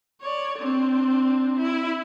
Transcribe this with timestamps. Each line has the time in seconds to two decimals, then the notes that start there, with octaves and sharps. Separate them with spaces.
0.21 C#5 D5
0.58 C4 D4
1.57 E4